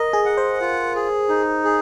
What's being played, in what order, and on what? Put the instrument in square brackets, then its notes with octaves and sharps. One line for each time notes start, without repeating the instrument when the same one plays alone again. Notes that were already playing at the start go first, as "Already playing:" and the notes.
Already playing: [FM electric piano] A#4 [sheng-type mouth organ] D#5
[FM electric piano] G#4
[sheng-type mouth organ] F#5
[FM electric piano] C5
[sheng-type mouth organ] F4
G#4
D#4
G#4